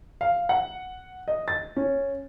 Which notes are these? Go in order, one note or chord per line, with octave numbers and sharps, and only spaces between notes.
F5
F#5
D#5
A6
C#4